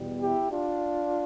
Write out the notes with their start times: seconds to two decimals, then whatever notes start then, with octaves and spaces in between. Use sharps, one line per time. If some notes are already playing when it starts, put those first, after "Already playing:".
Already playing: E2 B2 G3
0.21 E4 G4
0.51 D4 F4